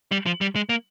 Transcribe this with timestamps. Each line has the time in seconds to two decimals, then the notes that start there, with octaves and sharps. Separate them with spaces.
0.12 G3
0.26 F3
0.41 G3
0.56 G#3
0.69 A#3